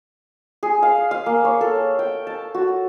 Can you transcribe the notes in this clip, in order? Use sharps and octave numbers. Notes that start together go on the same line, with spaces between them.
G#4
F5
F5
A#3
C#5
A4
G5
A5
F#4